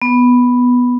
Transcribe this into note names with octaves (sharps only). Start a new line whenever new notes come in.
B3